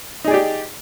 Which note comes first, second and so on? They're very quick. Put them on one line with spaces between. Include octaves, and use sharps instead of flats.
D#4 G#4 D5 G4